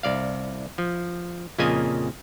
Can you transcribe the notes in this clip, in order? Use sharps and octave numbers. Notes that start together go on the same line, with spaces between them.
C2 D5 F5
F3
F2 A#2 C#3 A#3 D#5 G#5